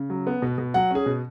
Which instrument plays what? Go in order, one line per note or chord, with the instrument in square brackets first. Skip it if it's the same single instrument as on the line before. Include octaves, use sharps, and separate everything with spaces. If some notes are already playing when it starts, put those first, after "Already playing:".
Already playing: [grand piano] C#3
F#3
B3
B2
B2
F#3 F#5
C#4 G#4
B2